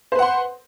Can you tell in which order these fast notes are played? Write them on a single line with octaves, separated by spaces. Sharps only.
C5 B4 F#5 C6